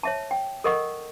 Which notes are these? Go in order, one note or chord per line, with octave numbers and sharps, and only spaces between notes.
C#5 E5 A5
G5
A4 A#4 D#5 F#5 C#6